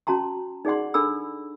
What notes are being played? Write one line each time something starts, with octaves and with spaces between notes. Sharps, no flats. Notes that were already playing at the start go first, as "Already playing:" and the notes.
C#4 F#4 A5 A#5 C6
D#4 G#4 D5 F#5 C6
D4 A4 B5 E6